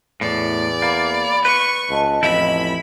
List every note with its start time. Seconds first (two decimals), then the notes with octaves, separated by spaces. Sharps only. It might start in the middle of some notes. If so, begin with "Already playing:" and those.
0.21 E2 A2 D5
0.82 A#3 B5
1.45 B4 C#6
1.89 C#2 D#5 A5
2.23 A1 F2 E4 B5